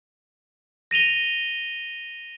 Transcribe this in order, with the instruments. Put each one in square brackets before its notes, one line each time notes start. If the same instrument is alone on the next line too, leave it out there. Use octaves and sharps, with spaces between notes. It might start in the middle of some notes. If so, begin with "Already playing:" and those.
[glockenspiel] A#6 D#7 F7 G7